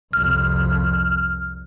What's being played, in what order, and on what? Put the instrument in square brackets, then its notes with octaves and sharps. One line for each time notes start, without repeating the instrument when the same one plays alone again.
[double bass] C2 F2 [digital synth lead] F6